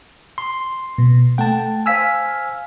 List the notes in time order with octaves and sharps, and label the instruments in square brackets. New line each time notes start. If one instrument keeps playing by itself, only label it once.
[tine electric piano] C6
[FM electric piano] B2
[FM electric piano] A3 F#5 [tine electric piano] G5 A5
[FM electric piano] C5 F5 F6 [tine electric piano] G#5 E6 B6